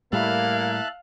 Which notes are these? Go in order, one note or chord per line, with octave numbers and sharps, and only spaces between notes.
A2 G3 A#3 E4 E5 F5 A5 F#6